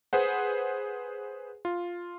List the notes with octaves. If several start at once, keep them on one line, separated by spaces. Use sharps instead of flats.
G#4 B4 C5 F#5
F4